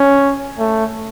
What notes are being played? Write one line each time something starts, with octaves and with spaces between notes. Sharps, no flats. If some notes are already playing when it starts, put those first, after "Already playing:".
Already playing: C#4
A3